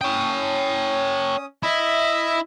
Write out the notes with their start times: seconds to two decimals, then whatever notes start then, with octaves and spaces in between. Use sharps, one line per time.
0.01 C#4 C#5 G5 D#6
1.63 E4 D#5 E5